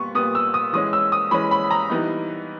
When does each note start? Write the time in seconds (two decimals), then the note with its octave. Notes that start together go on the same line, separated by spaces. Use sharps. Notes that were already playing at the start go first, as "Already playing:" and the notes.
Already playing: A#2 G3 B3 C#6
0.15 A#2 G3 B3 D#6
0.35 E6
0.54 D#6
0.73 E3 G#3 C#4 D#6
0.93 E6
1.12 D#6
1.31 E3 G#3 C#4 B5
1.51 B5
1.71 A#5
1.90 E3 G3 B3 D#4